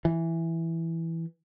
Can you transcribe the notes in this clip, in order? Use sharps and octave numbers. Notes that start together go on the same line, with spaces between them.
E3